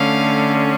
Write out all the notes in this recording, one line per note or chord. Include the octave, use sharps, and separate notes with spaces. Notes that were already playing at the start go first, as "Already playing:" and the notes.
Already playing: D3 A3 C#4 F5